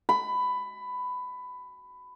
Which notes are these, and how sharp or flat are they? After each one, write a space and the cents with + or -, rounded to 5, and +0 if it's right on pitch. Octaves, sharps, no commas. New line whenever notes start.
B5 +15